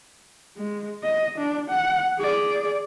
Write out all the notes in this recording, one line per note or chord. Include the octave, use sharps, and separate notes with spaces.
G#3
D#5
D4
F#5
G#4 D5